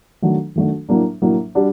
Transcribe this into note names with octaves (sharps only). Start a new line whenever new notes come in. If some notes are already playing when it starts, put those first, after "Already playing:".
D#3 F#3 A3 D4 F#4
D#3 F#3 A3 D4 F#4
A2 F#3 A#3 D4
A2 F#3 A#3 D4
G3 D4 F#4